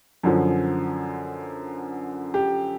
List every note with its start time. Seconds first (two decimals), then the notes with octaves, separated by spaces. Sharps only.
0.23 F#2 D3 F3
2.34 G4